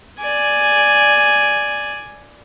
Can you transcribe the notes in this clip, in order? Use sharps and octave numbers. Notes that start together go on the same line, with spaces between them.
D5 G#5